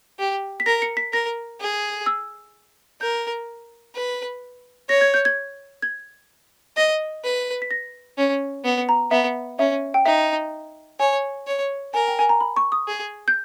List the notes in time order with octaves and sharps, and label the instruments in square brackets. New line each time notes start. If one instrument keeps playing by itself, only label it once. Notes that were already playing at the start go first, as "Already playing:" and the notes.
[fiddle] G4
[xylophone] B6
[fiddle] A#4 [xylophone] A#6
[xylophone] C#7
B6
[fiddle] A#4 [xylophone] A#6
[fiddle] G#4
[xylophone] E6
[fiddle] A#4 [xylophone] G6
[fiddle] B4
[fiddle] C#5 [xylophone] A#6
[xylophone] G#6
G6
G#6
G#6
[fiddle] D#5 [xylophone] A#6
[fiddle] B4
[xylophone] B6
A#6
[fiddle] C#4
B3
[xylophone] A#5
[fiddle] B3 [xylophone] E5
[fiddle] C#4 [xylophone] E5
[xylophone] G5
[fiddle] D#4 [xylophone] E5
[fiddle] C#5 [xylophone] G#5
[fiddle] C#5
[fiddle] A#4 [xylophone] G#5
[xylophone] G5
G#5
A#5
B5
C#6
D#6
[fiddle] G#4
[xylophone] G6